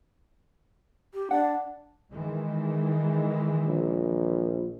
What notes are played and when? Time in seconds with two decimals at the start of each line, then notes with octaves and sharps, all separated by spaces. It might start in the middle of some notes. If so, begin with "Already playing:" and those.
1.14 G4
1.31 D4 F#5
2.12 D#3 E3 G#3
3.65 A#1